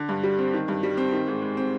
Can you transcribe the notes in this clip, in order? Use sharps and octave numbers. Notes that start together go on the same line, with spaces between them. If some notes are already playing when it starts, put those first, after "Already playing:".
Already playing: D3
G2
G3
C4
D#3
G2
G3
C4
D#3
G#2
G#3
C4